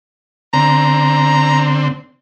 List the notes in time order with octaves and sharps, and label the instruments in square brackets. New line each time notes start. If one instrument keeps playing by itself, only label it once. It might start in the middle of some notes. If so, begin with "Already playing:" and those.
[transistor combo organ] D3 C4 [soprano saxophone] A#5